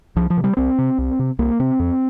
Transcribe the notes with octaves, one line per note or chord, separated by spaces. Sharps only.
C2 F3
F3
C3
G3
C2 C4
C3
C2
C3
C2 A#3
C3 C4
F2